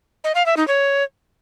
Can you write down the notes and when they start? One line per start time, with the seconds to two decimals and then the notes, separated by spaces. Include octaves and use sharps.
0.24 D#5
0.35 F5
0.46 E5
0.57 D#4
0.68 C#5